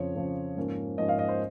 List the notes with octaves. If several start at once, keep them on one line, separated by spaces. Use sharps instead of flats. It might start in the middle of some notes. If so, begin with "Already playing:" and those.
Already playing: F2 C#3 F3 C#5
F2 C#3 F3
G#2 F3 A#3 C#4
G#2 F3 A#3 C#4 D#5
F5
D#5
C5